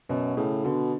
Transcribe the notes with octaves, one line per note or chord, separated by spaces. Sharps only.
F#2 B2
A2 C#3
B2 D3